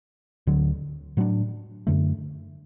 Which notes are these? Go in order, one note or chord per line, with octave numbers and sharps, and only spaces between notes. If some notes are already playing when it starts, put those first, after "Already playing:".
D2 D3 F#3
A2 F#3 D4
F#2 D3 A3